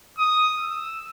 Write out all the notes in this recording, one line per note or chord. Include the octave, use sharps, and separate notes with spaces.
D#6
E6